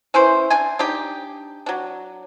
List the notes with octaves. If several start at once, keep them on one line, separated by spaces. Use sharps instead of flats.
C#4 E4 B4 C5
D4 G#5
D4 D#4 G4 G5
F#3 D4